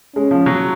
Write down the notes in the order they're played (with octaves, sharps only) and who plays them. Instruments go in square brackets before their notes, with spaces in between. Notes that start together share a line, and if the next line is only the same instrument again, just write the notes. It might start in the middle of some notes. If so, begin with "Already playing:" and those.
[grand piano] G#3 [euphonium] C#4
[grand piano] F3
F#3